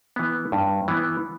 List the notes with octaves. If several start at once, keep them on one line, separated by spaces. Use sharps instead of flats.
E3 B3
G2
E3 B3